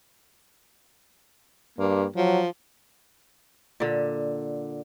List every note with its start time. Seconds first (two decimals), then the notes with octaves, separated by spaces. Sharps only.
1.79 G2 A#3
2.16 F3 F#3
3.80 A#2 D3